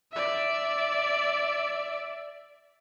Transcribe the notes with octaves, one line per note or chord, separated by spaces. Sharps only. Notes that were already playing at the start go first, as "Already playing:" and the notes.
D5 E5